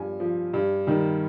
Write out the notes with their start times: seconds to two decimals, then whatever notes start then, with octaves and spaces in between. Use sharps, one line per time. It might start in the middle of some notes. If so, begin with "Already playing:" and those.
Already playing: G2 F3 G#5
0.20 F3
0.54 G2
0.87 D#3 G3